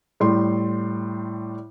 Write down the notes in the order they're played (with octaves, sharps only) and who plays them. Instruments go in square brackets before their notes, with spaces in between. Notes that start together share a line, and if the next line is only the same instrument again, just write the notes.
[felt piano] A2 G3 C6